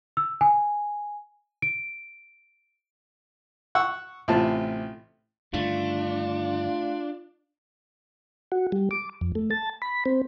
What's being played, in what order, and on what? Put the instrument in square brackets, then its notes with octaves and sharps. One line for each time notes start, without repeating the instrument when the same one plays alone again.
[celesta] E6
G#5
D7
[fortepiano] F#5 C#6 E6
A1 C3 F4 A5
[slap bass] G2 D3 D#3 [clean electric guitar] A3 [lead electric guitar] D4 [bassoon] F4
[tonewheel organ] F#4
G3
D6
F2
A3
A5
B5
C4